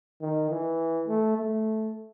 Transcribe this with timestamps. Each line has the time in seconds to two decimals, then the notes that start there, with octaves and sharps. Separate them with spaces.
0.21 D#3
0.50 E3
1.08 A3
1.37 A3